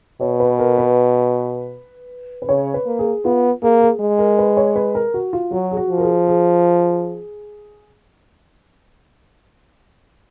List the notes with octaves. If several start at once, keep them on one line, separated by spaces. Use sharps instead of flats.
B2 C#5
B4
A#4
B4
B4
C#3 C#5
B4
A#3
G#4
B3 F4
A#3 G#4
G#4
G#3
A#4
B4
C#5
B4
A#4
F#4
F4
F#3 F#4
G#4
F#4
F3
A#4
G#4
G#4